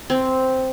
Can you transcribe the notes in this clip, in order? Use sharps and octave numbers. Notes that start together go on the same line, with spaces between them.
C4